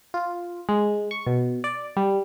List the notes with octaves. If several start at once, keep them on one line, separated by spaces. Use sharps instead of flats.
F4
G#3
C#6
B2
D5
G3